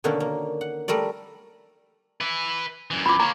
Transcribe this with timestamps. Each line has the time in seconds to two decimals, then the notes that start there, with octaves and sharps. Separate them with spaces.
0.04 B2 D3 D#3 A#3 C#4 D4
0.20 A#3
0.61 F#5
0.88 G3 A3 A#4 D5
2.21 B4 E5
2.91 F#2 E3
3.06 B5 D6
3.20 A#3 C#5 A#5